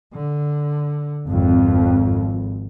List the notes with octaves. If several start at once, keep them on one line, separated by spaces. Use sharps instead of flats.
D3
G#1 F2